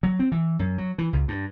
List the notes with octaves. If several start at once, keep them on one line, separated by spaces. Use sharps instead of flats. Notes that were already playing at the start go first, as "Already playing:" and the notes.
F#3
C4
E3
F#2
F#3
E3
C#2
G2